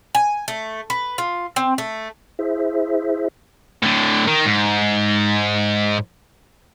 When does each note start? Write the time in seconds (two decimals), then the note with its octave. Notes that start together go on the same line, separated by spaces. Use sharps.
0.15 G#5
0.48 A3
0.90 B4
1.18 F4
1.56 C4
1.78 A3
2.39 E4 G#4 C5 E5
3.83 A2 D3
4.27 D#3
4.45 G#2